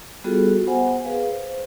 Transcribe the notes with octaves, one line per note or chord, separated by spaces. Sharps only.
G3 B3 F4 F#4 G#4 A4
B3 C5 F#5 G#5
G#4 B4 F5
C5